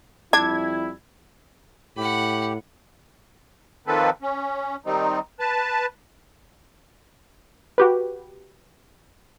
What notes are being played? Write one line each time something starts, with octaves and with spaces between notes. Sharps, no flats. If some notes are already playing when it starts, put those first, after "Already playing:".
F2 G3 D4 E4 G#6
A2 G4 F#5 B5
D#3 F3 A#3 C4 A4 B4
C#4
D#3 G3 C4 D#4
B4 A5
F#4 G4 B4